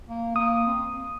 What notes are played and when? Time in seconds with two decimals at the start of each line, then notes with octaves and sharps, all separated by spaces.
0.09 A#3
0.35 A#3 D#6
0.67 C4